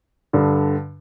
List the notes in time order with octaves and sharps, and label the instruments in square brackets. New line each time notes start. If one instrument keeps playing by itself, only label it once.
[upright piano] G2 D3